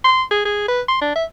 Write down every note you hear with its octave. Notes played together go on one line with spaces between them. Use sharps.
C6
G#4
G#4
B4
C6
D4
E5